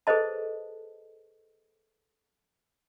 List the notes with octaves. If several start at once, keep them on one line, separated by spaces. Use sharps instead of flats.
G#4 A4 B4 C5 D#5 A5